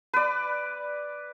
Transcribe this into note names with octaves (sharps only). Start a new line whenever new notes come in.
B4 D5